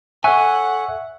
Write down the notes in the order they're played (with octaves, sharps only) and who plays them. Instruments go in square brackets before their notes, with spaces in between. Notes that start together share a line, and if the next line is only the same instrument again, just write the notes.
[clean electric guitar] A4 C#5 G#5 [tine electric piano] E5 C#6 F#6 [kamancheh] F#5